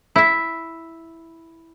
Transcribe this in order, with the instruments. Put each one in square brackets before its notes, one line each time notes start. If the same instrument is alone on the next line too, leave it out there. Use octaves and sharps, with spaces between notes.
[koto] E4 E5